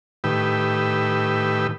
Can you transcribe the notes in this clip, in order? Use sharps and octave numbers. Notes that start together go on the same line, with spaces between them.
A2 D#3 G4 B4 E6